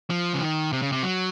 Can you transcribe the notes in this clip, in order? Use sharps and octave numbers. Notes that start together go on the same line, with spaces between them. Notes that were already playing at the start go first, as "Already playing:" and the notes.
F3
C#3
D#3
C3
C#3
C3
F#3